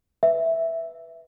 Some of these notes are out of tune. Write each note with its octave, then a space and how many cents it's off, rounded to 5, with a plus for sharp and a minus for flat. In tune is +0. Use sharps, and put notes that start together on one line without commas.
B4 +0 E5 +0